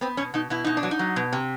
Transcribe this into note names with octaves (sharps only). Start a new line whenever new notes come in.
B3 C4
B2 C#4
B2 D#4
B2 E4
B2 D#4
D4
F#3
D#4
F#3
B2
C3